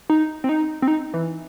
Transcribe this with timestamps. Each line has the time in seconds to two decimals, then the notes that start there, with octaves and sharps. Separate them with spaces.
0.10 D#4
0.44 C4
0.49 D#4
0.82 C4
0.88 D#4
1.14 E3